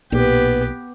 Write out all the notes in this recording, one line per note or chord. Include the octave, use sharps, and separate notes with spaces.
B1 A#2 B3 G4